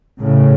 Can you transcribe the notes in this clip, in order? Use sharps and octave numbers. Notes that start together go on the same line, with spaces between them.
A2 C#3